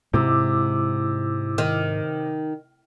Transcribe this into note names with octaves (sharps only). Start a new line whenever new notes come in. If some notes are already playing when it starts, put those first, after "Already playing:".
G#2 C3 G#3 E4 D6 E6
D#3